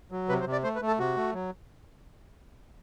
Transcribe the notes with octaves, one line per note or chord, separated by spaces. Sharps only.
F#3
C3 B4
C5
C3
D5
A3 C5
B4
A3
A4
C3 F#4
A3
F#3